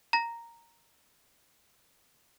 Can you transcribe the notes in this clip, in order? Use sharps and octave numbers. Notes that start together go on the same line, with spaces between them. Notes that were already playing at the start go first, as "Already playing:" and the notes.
A#5 A#6